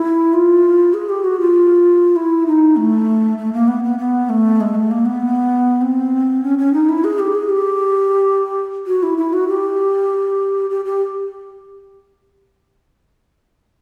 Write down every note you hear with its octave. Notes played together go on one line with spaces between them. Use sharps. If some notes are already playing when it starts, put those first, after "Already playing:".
Already playing: E4
F4
G#4
G4
F#4
F4
E4
D#4
A3
A3
A#3
B3
B3
B3
A3
G#3
A3
A#3
B3
C4
C#4
C#4
D#4
E4
G#4
G4
G#4
G4
F#4
E4
E4
F#4
G4
G4
G4